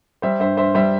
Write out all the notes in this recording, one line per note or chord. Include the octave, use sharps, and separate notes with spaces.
G3 C5 E5
G2 C5 E5
G2 C5 E5
G3 C5 E5